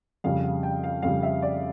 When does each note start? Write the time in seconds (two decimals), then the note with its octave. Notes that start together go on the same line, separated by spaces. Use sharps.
0.24 F2 C#3 G3 F5
0.44 F5
0.63 G5
0.83 F5
1.02 F2 C#3 G3 F5
1.23 E5
1.42 D5